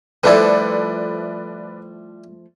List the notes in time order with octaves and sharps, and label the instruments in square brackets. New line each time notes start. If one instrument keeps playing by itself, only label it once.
[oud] F3 A3 A4 [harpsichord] G3 D4 E4 [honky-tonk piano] B4 D5